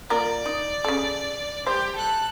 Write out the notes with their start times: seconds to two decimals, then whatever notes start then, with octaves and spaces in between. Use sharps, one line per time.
0.10 A#3 F4 A#4 D5
0.46 D#4
0.85 C#3 A4
1.66 G3 G4 C5
1.95 A4 F#6